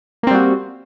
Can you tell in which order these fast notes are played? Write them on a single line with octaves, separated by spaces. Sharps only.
A#3 C4 G3 F#4